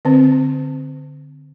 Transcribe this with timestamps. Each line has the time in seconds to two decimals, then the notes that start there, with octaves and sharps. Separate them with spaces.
0.05 D3 C4